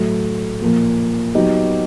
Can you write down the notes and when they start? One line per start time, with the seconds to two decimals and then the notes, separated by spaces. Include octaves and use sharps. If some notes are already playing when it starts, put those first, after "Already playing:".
Already playing: A2 F#3 A3
0.62 A#2 F3 A#3
1.35 F#3 B3 D#4 G4